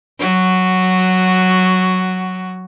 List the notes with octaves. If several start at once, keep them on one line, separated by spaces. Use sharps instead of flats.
F#3 F#4